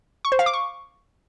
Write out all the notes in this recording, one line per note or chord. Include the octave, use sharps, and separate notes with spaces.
C#6
C5
F5
D6
C#6